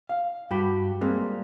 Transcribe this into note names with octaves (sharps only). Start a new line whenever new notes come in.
F5
G2 F#4 G4 B5
G3 G#3 A#3 C4